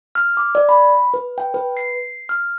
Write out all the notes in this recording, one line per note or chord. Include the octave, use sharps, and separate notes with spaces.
F6
D6
D5
B5
B4
G5
B4
C7
F6